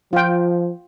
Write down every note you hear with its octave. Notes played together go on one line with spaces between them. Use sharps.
F3 F4 G5